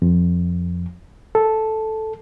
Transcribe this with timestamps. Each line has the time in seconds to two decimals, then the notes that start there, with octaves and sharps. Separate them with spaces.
0.02 F2
1.35 A4